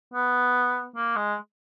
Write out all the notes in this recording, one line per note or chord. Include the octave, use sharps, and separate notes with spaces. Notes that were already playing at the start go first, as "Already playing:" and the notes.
B3
A#3
G#3